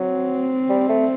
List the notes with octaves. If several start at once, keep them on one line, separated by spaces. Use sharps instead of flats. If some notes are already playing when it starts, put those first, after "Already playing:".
Already playing: F#3 C4
G3
A3